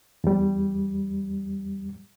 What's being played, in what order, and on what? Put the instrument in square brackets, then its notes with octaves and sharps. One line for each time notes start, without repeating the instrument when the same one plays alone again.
[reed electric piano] E2 G3